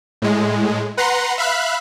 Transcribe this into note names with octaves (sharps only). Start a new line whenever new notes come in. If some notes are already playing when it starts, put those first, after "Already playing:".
A2 G#3
B4 F#5 A#5 C6
E5 F5 B5 F#6